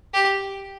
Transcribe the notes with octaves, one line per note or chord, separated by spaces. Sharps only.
G4